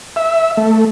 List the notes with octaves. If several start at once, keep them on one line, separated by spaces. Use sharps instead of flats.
E5
A3